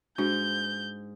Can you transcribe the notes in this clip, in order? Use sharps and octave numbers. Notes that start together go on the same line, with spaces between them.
G#2 D4 F#4 G6